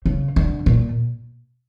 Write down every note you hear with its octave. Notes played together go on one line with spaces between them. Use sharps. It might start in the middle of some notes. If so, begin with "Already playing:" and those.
C#3
D3
A#2